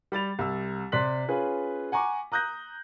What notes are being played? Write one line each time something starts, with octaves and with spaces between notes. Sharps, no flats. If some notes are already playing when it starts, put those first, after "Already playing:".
G3 B5 A6 F7
C2 E6
C3 D5 C6 F#6 B6 F#7
C#4 F4 G#4 B4
F#5 G#5 A#5 C#6 D6
A#5 D#6 F#6 G6 A#6